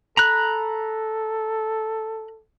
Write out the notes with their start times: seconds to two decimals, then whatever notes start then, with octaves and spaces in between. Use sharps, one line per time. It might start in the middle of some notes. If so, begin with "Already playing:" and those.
0.17 A4 A#5 B5 F#6